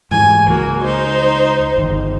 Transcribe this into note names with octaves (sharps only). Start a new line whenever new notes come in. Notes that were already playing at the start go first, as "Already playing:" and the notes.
G#2 E3 G#5
C#2 A#3 F#4
D#4 C5
G1 D#3